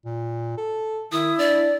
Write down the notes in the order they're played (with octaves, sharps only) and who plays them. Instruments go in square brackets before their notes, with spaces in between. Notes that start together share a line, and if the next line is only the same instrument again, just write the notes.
[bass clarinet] A#2
A4
[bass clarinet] D#3 [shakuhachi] E4 [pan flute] D#6
[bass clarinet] D4 [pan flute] D5